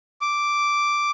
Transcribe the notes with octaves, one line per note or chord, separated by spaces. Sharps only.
D6